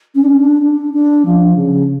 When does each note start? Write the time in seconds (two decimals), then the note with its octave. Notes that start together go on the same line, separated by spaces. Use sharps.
0.15 C#4
0.22 D4
0.29 C#4
0.38 D4
0.61 D4
0.93 D4
1.25 F3
1.56 C#3